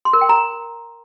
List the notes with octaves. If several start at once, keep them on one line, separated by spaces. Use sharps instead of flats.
C6
A#4
G5
A#5